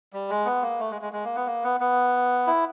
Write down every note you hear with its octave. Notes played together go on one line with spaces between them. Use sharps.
G3
G#3
B3
A#3
A3
G#3
G#3
G#3
A#3
B3
A#3
B3
B3
E4